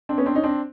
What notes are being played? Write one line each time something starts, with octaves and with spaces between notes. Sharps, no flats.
C4 D4
B3 C#4
C4 D4
C#4 D#4
C4 D4